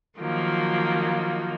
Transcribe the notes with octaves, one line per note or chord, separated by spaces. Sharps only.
D#3 F3 F#3 A#3